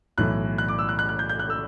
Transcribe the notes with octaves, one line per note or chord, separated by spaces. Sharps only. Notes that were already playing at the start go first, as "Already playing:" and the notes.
B1 A2 E3 F#6
F#6
D6
E6
F#6
F#6
F#6
G6
G6
F#6
E6